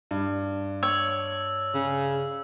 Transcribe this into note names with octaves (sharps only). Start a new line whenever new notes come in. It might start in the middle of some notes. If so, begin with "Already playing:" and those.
G2
C#5 E6
C#3